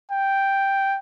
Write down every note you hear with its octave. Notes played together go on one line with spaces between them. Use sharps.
G5